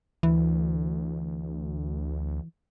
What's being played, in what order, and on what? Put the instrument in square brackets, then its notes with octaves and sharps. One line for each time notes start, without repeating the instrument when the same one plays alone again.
[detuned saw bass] D2 [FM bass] E3